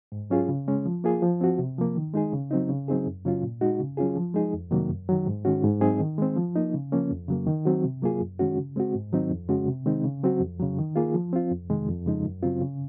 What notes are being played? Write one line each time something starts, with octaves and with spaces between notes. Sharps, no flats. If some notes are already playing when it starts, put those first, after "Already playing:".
G#2
F#3 C#4 F4 G#4
C#3
G#3 C#4
F3
A#3 F4 G#4
F3
C4 F#4
C3
F3 A#3
D#3
G#3 D#4 G#4
C#3
F#3 C4 D#4
C#3
F#3 C4 D#4 G#4
F#2
C#3 F#3 C#4 F4
A#2
G#3 D#4 F#4
C#3
F#3 C#4 F4 G#4
F3
G#3 D#4 G#4
F2
C3 D#3 F#3 A#3
F#2
D#3 F#3
G#2
D#3 G#3 C#4 F#4
G#2
F#3 C4 D#4 G#4
D#3
G#3 C4
F3
A#3 D#4
C#3
F3 A#3 C#4
F2
C#3 F#3 A#3
D#3
F#3 C4 F#4
C3
F#3 A#3 F4 G#4
F#2
D#3 G#3 C#4 F#4
C#3
G#3 C4 F#4
G#2
D#3 F#3 C4 D#4
F2
C#3 G#3 C#4 F#4
C3
D#3 G#3 C4 D#4
C#3
F#3 C4 F#4
F2
C#3 F#3
D#3
A#3 F4 G#4
F3
C4 F4
F2
C3 D#3 G#3
F2
C#3 F3 G#3 D#4
F#2
C#3 F#3 C4 F4
C#3